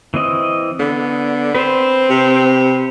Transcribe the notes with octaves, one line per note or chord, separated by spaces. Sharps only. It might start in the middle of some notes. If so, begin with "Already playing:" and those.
E3 C4 D#5
D3 B3
C4 B4 C5
C3